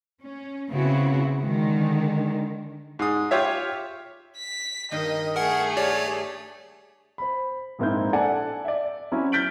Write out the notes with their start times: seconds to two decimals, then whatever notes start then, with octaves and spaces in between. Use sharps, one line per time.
0.23 C#4
0.70 C#3 B3 C4 E4 F#4
1.41 D3 D#3 G#3
2.99 G#2 D#6
3.31 F4 G4 C#5 E5
4.37 B6
4.91 G2 D#3 A#3 D#5
5.36 A3 G#4 A#4 F#5
5.77 G4 C#5 D5
7.18 C5 B5
7.79 A#1 G#2 A#3 C4 E4 G6
8.13 A4 D5 F#5 G#5 A5
8.65 D5 E5
9.12 F#3 C4 C#4 E4 E5
9.32 F6 G6 A6 B6 D7 F#7